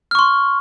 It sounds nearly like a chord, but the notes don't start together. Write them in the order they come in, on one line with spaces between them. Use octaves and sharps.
F6 C#6 C6